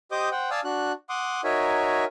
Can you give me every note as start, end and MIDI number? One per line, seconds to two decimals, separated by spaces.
0.12 0.29 67
0.12 0.29 72
0.12 0.29 75
0.12 0.29 86
0.12 0.29 87
0.12 0.29 91
0.32 0.50 72
0.32 0.50 78
0.32 0.50 79
0.51 0.60 74
0.51 0.60 77
0.51 0.60 80
0.51 0.60 81
0.51 0.60 87
0.51 0.60 88
0.64 0.93 62
0.64 0.93 66
0.64 0.93 90
1.09 1.41 78
1.09 1.41 84
1.09 1.41 86
1.09 1.41 87
1.44 2.05 63
1.44 2.05 66
1.44 2.05 70
1.44 2.05 73
1.44 2.05 76
1.44 2.05 80